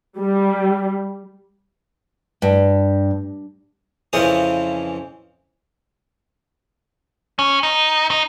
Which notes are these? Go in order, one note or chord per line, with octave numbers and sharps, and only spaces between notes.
G3
G2
F2 C#3 E3 C#4 C5 D#6
C#4
D#4
D#4